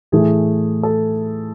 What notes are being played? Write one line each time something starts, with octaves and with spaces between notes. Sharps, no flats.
A2 E3 A3 G#4
A4